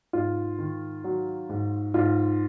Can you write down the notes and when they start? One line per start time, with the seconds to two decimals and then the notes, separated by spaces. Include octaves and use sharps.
0.13 G#2 F4
0.59 D#3
1.04 F#3
1.49 G#2
1.94 G#2 F4